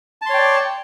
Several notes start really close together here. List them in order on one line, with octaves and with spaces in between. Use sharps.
A5 C6 C#5 G5 D5